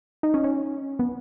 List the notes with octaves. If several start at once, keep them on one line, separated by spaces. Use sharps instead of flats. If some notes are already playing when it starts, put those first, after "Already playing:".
D#4
C#4
C#4
B3